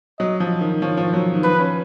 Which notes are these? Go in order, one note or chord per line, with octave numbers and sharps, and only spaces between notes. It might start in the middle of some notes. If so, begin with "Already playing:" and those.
F#3 D#5
F3
D#3
F3 C#5
F3
F#3
D#3
F3 B4
C#4